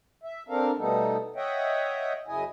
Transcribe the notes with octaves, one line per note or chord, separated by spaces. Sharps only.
E5
C4 D4 A4 A#4 F5
B2 G3 A3 B3 D#4 A4
C#5 D#5 E5 F#5 G5
F#2 C#3 E4 D#5 G#5